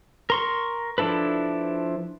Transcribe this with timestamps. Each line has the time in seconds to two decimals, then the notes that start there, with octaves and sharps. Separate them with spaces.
0.30 A#4 C6 C#6
0.98 F3 D4 E4 A4 B4